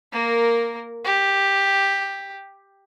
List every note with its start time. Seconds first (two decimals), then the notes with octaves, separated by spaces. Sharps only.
0.13 A#3 A#4
1.05 G4